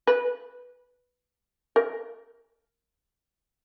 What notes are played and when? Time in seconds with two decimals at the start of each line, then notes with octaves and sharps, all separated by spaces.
0.07 B4
1.76 A#4